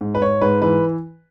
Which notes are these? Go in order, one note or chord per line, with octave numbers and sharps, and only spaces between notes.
G#2
B4
G#2 C#5
G#2 B4
E3 B4